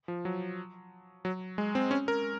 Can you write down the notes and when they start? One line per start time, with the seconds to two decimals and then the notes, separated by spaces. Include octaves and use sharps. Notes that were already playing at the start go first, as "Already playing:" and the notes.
0.08 F3
0.25 F#3
1.25 F#3
1.58 G#3
1.75 C4
1.91 C#4
2.08 A#4